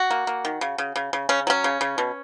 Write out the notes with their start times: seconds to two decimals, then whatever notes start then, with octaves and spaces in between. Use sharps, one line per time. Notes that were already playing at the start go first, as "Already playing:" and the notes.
Already playing: F#4
0.11 A#3
0.27 A#3
0.45 D#3
0.61 C#3
0.78 C#3
0.96 C#3
1.13 C#3
1.29 C#3 C#4
1.47 F#3 C#4
1.64 C#3
1.81 C#3
1.98 B2